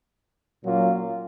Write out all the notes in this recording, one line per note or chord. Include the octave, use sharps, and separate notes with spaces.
A#2 F#3 A#3 C#4 F4